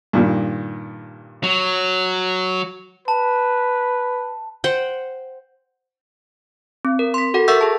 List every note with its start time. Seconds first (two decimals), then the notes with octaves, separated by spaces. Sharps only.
0.13 G2 A#2 D#3
1.43 F#3
3.08 B4 A5
4.64 C5 F#5 G5
6.85 C4
6.99 A#4
7.14 C6 B6
7.34 F#4 A4 F#5
7.48 A#4 E5 F#5 C#6 E6 G6
7.61 G#4 A5